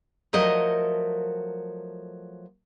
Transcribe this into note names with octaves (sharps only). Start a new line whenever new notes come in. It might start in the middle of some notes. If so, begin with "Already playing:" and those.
F3 F#3 A3 A#4 D#5